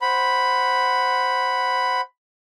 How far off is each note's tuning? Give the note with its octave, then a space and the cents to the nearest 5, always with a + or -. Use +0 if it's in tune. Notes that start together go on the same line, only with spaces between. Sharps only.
C5 +0 F#5 +0 B5 +0